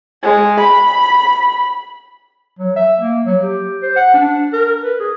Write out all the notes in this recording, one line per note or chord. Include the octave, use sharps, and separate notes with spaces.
G#3
B5
F#3
E5
A#3
F#3
G4
C5
F#5
D4
A#4
B4
G#4